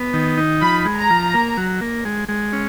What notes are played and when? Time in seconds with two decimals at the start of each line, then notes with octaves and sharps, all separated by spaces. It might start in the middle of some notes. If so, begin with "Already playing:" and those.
Already playing: B3
0.13 D#3
0.37 D#4
0.61 F3 B5
0.85 G#3
0.97 A#5
1.10 F3
1.34 A#3
1.57 F#3
1.81 A#3
2.05 G#3
2.29 G#3
2.53 C#4